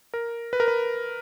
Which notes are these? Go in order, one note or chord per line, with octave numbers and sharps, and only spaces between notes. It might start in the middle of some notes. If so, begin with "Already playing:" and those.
A#4
B4
A#4
B4